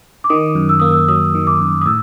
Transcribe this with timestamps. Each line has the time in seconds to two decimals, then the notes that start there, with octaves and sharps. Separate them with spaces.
0.24 D6
0.30 D#3 D#6
0.55 F#2
0.69 E6
0.80 A#3 D#6
0.91 E6
1.08 F#3 D#6
1.35 D#3
1.47 D6
1.60 F#2
1.81 D#6
1.86 A2 E6